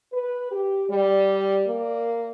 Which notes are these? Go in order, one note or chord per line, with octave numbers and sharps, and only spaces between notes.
B4
G4
G3 D5
A#3